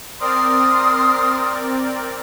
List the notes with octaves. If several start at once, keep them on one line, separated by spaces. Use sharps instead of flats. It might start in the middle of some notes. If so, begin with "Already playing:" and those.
C4 A#4 D5 C6 D#6 F6